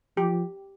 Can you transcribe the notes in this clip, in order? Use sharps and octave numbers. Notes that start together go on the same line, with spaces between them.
F3 G4